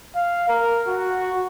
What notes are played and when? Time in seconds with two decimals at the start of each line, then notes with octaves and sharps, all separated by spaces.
0.15 F5
0.49 A#4
0.87 F#4